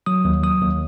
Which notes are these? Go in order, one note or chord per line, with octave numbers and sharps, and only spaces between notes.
F#3 D#6
D#2
F#3 D#6
D#2